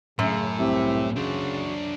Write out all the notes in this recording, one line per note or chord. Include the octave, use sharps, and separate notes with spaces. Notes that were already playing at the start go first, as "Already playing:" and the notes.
F#2 A2 C#3
C2 C4 G4 E5
C#3 D4 F#4 C5